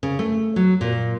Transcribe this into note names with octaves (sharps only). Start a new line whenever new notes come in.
C#3
A3
F#3
A#2